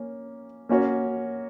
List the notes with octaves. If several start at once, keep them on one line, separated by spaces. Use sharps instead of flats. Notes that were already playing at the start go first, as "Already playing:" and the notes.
Already playing: A#3 C#4
A#3 C#4 F#4 C#5